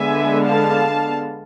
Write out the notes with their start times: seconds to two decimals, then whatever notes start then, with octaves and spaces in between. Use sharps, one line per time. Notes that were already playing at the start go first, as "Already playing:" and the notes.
Already playing: D3 G#3 B3 D4 E5 G#5
0.44 F5 A5